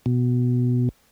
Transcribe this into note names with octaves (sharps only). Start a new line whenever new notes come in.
B2